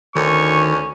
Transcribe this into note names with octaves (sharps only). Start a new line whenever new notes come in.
D2 D#3 C#4 C#6